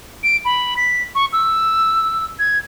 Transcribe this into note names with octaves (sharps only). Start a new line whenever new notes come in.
D7
B5
B6
C#6
E6
G#6